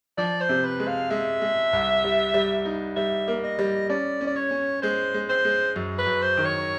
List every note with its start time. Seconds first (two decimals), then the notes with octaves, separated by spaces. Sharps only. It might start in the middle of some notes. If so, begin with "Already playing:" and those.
0.18 F3 D5
0.41 C5
0.49 C3
0.64 B4
0.79 G#3
0.87 F5
1.11 G#3 E5
1.41 G#3
1.73 C2
2.04 G3
2.34 G3
2.65 D#4
2.96 G3 E5
3.28 A#3
3.44 D#5
3.59 G3
3.89 C#4 D5
4.21 C#4
4.27 D5
4.36 C#5
4.51 C#4
4.82 G#3 C5
5.14 G#3
5.29 C5
5.45 G#3
5.76 F#2
5.99 B4
6.07 F#2
6.22 C5
6.37 D#3
6.45 C#5